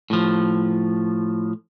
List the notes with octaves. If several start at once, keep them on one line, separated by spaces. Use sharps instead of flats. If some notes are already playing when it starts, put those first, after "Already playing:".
A2 F3